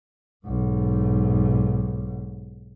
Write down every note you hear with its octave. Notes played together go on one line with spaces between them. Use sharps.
B1 G#2